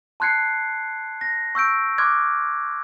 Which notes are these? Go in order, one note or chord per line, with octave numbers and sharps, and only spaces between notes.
A5 C6 F#6 G#6 C7 C#7
A#6
C#6 E6 G6 D7
C6 D6 F6 F#6 G#6